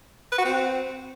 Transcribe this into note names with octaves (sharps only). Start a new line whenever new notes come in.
B4
F#4
C4